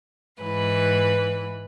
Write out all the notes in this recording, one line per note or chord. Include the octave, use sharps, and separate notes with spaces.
G#2 E3 B4